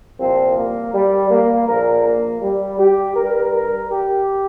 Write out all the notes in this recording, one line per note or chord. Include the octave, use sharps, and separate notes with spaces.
C2 A#2 F3 C4
A#3
G3
A#3
A#1 A#2 F3 A#4
A#3
G3
G4
G2 G3 A#4
A#4
G4